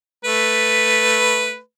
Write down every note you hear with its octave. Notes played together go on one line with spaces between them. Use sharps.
A3 B4